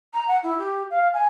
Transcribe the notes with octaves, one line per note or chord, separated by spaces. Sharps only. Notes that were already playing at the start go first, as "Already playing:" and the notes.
A#5
F#5
E4
G4
F5
G#5